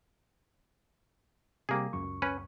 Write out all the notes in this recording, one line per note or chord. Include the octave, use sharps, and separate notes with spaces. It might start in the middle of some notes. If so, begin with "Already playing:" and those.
C3 G3 A#3 G4 G#4
C#2 F#2 C#6
C#4 B4